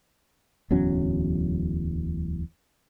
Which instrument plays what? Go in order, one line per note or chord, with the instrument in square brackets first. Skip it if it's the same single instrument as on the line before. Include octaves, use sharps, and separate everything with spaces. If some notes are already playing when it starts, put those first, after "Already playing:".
[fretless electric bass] D1 E2 F#3 C#4